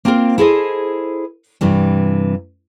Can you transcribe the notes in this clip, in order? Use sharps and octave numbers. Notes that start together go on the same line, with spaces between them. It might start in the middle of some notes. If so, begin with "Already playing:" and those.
A#3 C4 F4 G#4 A#4 C5
E4 G#4 A4 C5 D#5
G2 C3 E3 G3